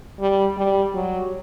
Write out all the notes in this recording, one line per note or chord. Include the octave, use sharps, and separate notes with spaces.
G3
G3
F#3